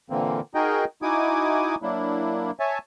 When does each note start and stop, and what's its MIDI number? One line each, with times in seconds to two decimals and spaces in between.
0.10 0.40 46
0.10 0.40 50
0.10 0.40 52
0.10 0.40 58
0.10 0.40 60
0.55 0.85 63
0.55 0.85 66
0.55 0.85 68
0.55 0.85 70
0.55 0.85 75
0.55 0.85 79
1.02 1.75 63
1.02 1.75 64
1.02 1.75 66
1.02 1.75 80
1.02 1.75 86
1.02 1.75 87
1.82 2.51 54
1.82 2.51 58
1.82 2.51 62
1.82 2.51 64
2.60 2.78 73
2.60 2.78 76
2.60 2.78 80
2.60 2.78 81